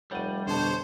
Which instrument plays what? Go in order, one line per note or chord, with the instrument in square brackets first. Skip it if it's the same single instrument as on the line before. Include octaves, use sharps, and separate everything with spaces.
[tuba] F1 [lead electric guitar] G3 [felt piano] C#5 F#5 D#7
[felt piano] F1 B2 A5 [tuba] D3 [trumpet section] C5 C#5